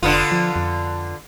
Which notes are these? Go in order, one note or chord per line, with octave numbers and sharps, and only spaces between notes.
F1 D3 B3 F4
F3
F2